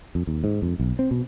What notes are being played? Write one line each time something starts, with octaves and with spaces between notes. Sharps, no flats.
F2
D#2
G#2
F2
B1
C4
B2